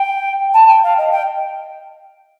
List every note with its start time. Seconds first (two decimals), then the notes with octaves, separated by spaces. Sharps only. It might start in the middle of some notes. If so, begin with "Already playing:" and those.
Already playing: G5
0.54 A5
0.68 G5
0.83 F5
0.98 D#5
1.12 G5